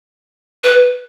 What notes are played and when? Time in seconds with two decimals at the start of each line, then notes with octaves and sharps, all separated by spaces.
0.64 B4